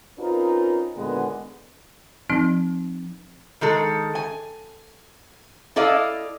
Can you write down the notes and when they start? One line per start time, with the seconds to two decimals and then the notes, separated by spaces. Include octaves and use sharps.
0.18 C4 C#4 D#4 F4 A#4 B4
0.95 D#2 A#2 D3 G#3 B3
2.30 F3 C4 D#4
3.61 D#3 G#3 A4
4.15 G#5
5.76 E4 A4 D5 D#5 F5